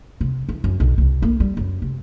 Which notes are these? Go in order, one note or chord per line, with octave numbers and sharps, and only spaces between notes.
C3
E3
F#2
B1
C2
A#3
G3
F#2
C3